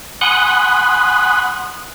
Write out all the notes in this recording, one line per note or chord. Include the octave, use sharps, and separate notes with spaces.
F#5 G#5 B5 C6 D#6 F#6